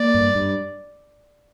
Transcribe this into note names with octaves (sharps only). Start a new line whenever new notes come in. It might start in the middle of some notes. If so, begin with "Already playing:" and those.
Already playing: A#3 D5
G2
G2